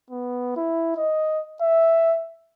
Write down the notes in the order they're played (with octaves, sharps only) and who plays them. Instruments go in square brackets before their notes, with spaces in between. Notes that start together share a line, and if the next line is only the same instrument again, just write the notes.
[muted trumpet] B3
E4
D#5
E5